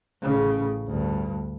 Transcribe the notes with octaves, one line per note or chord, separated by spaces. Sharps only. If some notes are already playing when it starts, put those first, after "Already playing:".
A1 C#3
D2 G2